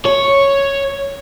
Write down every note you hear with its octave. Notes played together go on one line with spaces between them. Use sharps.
C#5